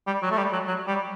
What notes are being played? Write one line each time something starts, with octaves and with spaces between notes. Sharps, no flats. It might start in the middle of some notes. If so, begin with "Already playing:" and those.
G3
F#3
A3
G3
F#3
F#3
G3